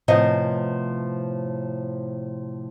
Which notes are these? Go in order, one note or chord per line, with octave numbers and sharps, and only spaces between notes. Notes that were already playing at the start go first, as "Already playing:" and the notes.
A2 C3 F3 B3 D#5